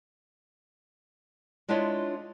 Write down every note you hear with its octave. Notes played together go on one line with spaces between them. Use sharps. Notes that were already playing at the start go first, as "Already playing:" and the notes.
G#3 D4 E4 F4 C#5 D#5